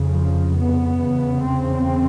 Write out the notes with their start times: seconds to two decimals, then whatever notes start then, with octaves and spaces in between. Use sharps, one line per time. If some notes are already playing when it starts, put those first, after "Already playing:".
Already playing: F2 C#3
0.11 F3
0.57 B3
1.01 E2 C#3
1.47 C4